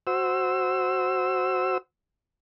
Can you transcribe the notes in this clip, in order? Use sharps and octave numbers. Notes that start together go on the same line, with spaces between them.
F#4 C5 E6